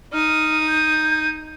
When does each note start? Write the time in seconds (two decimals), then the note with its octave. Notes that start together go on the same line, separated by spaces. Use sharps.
0.13 D#4 D#6 F6
0.67 G6